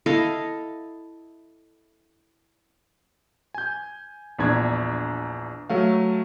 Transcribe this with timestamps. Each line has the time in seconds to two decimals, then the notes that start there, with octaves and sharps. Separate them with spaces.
0.06 E4 A4 D#5 F5
3.54 G#5 G6
4.39 A#1 E2 D4 G#6
5.70 F#3 A3 F5